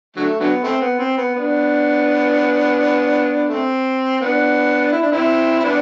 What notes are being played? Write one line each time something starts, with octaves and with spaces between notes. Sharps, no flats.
D3 F#3 A3
D3 F#3 B3
A3 C4
B3
C4
B3
B3 D4
A3 C4
B3 D4
E4
D4
C4 E4
E4
B3 D4